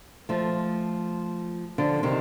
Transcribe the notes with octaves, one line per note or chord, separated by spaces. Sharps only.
F3 A3
D3 F3
C3 D#3